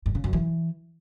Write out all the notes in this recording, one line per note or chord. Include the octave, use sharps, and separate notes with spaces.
G2
C#3
F#2
E3